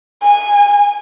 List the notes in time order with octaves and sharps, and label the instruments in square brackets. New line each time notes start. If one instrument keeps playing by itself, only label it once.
[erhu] G#5